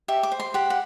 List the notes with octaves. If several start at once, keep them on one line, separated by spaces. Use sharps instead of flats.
G4 E5
D6
C5
C6
G4 F#5
F#5